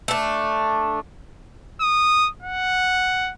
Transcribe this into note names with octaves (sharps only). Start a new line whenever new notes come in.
A3 D4
D#6
F#5